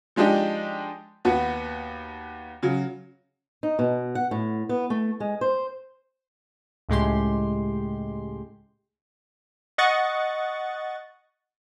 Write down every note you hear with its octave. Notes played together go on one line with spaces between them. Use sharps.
F3 G#3 D4 D#4 G4
D#2 B3 F#4
C#3 F#3
D#4
B2
F#5
A2
B3
A3
G#3
C5
C#2 A2 G#3 G4 C6
D#5 F#5 C#6 A6